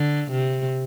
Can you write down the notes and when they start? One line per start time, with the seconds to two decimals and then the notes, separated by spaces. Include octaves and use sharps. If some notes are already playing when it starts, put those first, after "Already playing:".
Already playing: D3
0.31 C3